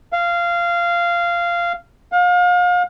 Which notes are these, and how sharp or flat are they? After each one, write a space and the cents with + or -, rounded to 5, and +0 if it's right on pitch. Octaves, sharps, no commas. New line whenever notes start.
F5 -15
F5 +35